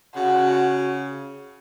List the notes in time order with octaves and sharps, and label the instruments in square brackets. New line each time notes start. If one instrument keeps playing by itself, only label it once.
[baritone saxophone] C#3 [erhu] F#4